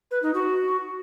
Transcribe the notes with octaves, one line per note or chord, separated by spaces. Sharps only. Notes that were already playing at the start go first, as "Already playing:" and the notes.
B4
D#4
F#4